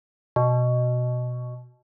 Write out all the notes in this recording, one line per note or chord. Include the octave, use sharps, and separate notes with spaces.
B2